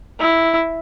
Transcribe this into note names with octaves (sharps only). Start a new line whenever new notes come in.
E4